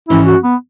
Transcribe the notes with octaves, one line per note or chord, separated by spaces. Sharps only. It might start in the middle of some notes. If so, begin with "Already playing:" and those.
G#2 E3 C#4 E4
F#4
B3